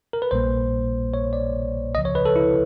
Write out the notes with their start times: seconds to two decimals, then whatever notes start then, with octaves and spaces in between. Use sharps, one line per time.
0.13 A#4
0.22 B4
0.31 A#1 A#2 G3 A#3 C5
1.14 C#5
1.33 D5
1.95 C#2 C#3 F3 D#5
2.05 C#5
2.15 B4
2.25 A4
2.36 E4